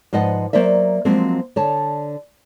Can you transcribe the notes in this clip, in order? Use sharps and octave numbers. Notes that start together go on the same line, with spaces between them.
G#2 F3 B4 D#5 F#5
F#3 A#3 C5 D5 E5
F3 F#3 G#3 A#3 C4
D3 C#5 A5